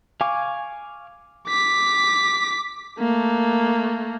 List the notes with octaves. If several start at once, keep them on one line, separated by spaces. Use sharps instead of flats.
F5 G#5 C#6 D6
D6 B6
A3 A#3